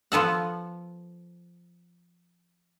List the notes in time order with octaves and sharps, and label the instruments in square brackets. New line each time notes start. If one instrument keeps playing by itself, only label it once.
[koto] F3 B3 A4 F#5